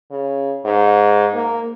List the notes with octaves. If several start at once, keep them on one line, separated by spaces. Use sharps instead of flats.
C#3
G#2
A#3